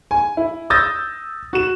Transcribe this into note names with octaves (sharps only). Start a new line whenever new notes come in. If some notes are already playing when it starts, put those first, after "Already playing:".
G#5
E4
D#6 E6 G6 A6 A#6
F#4 E7